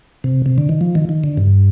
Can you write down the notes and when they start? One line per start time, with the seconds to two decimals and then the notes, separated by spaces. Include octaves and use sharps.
0.24 C3
0.46 C3
0.58 D3
0.69 D#3
0.81 F3
0.95 D#3
1.09 D#3
1.24 D3
1.37 G2